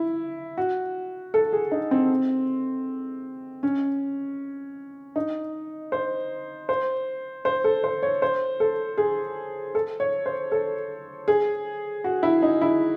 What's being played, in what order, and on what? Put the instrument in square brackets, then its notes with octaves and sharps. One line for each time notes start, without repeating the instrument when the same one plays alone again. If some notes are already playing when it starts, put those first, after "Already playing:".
Already playing: [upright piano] E4
F#4
A4
G#4
D#4
C4
C#4
D#4
C5
C5
C5
A4
C5
C#5
C5
A4
G#4
A4
C#5
C5
A4
G#4
F#4
E4
D#4
E4